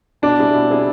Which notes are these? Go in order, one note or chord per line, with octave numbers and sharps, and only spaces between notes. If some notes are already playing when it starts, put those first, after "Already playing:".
B2 D4
G3 C4 E4 G#4
B2
G3 C4 E4 G#4